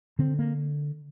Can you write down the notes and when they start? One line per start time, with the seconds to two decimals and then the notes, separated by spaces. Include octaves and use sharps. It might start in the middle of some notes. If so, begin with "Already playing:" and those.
0.19 D3 C4
0.39 A#3